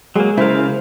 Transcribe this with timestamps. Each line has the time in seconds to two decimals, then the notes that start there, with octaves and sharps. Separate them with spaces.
0.16 F#3 G#3 A#3 G#4
0.37 C#3 E4 A#4 C5 F5